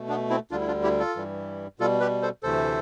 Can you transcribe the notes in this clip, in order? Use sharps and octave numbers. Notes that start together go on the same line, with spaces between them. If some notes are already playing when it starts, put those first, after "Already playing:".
Already playing: B2 A3
B3 D4
C4 E4
D2 D3 G3 D4 F4
E4
D4 F4
E4 G4
F4 A4
G2 E3 G3
B2 G3 F4 A4
G4 B4
A4 C5
D2 C3 E3 A3 A4 C5